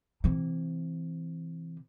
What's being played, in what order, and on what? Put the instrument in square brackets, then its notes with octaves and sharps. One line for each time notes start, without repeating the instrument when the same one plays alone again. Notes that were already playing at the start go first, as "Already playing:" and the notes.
[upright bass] C3 E3